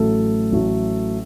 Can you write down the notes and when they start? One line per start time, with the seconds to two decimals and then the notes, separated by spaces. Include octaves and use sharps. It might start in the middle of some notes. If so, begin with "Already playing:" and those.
Already playing: A1 A2 F#3 A3 A4
0.52 A1 A2 F#3 A3